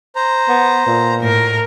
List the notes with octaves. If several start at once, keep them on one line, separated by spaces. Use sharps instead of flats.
C5 A#5
B3
A#2
A2 A#4